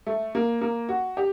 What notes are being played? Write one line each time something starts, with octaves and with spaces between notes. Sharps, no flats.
A3
A#3
A#3
F#4
G4